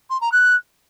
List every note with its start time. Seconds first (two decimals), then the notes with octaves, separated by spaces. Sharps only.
0.10 C6
0.21 A#5
0.32 F#6